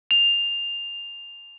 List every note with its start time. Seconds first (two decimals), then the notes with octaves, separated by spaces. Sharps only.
0.11 F7